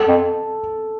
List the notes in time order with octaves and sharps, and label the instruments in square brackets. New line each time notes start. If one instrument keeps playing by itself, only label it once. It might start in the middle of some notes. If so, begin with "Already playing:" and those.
Already playing: [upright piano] A4
[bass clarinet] F2